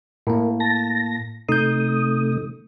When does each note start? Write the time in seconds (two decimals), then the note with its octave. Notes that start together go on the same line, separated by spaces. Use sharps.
0.27 A2 A#3 A#4
0.60 A5 A#6
1.49 C3 A3 D#4 D#6 G6